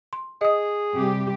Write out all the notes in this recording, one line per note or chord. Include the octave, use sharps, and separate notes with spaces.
C6
G#4 D#5 D#6
C3 G3 G4